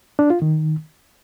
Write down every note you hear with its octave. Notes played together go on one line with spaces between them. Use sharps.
D4
F4
D#3